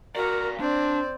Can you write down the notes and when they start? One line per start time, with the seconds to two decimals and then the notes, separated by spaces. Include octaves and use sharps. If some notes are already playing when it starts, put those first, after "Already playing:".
0.16 F#4 A#4 D5 F5 A#5
0.60 C4 D4 C5 D5